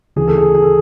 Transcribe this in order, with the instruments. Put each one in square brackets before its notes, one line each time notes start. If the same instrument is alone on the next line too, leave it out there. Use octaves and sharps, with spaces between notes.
[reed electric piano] D2 C#3 E3 [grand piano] G#4
[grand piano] A4
G#4
G#4
A4